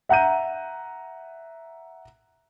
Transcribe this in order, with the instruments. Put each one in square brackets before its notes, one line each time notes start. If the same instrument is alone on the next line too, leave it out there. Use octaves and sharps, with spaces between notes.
[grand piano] E5 F#5 A#5 G6 D#7